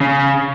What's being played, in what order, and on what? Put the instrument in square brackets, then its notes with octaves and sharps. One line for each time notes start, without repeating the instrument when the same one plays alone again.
[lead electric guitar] C#3